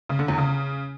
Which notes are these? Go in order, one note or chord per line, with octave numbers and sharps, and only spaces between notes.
C#3
D3
E2
C#3